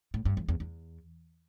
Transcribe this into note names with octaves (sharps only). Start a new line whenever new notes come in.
A2
G2
E2
E2
E2